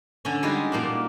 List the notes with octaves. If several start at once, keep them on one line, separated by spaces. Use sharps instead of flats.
D3 C#4
G3 G#3 D#4 F4 F#4
A#2 A#3 D4